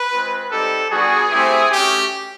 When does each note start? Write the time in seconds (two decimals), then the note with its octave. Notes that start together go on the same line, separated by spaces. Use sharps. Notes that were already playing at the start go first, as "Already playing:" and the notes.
Already playing: B4
0.11 G#3 C4 F4
0.51 G3 C4 D#4 G4 A4
0.91 G3 B3 D4 F#4 G#4
1.31 A3 C4 E4 G4
1.71 A3 C#4 F#4 G4